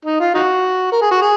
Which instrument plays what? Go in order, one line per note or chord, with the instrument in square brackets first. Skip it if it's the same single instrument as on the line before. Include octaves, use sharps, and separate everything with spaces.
[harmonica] D#4
F4
D#4 F#4
A#4
G#4
F#4
G#4